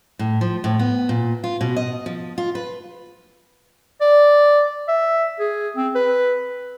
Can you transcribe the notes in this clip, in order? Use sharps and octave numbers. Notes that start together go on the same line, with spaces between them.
A2
F3
A2
B3
A#2
F4
B2
D#5
F3
F4
B4
D5
E5
G#4
C4
B4